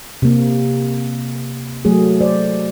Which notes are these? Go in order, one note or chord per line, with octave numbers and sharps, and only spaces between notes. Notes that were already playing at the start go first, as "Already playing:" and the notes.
C3 A#3
F#3 A3 G#4
C5 D5